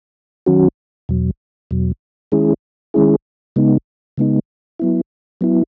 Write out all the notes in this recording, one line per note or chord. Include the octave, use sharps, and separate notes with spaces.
D#3 F#3 C#4 F#4
E2 B2 F#3
E2 B2 F#3
D#3 G#3 C#4 E4 G#4
D#3 G#3 C#4 E4 G#4
C#3 G#3 B3 D#4
C#3 G#3 B3 D#4
F#3 B3 E4
F#3 B3 E4